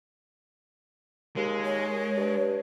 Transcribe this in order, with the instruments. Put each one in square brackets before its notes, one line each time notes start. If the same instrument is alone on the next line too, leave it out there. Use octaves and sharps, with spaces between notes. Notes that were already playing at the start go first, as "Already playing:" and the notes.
[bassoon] D#2 [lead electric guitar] G#3
[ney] C#5
[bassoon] G2